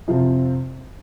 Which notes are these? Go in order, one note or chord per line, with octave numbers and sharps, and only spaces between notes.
F2 C3 F3 C4 F4